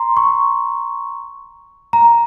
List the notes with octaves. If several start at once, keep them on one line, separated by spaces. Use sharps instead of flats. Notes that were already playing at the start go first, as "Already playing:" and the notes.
Already playing: A#5 C6
C#6
A#5